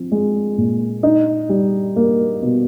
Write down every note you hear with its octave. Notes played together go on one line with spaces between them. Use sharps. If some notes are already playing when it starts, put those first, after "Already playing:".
Already playing: F3 C4
G#3
A#2
D#4
G3
A#3
B2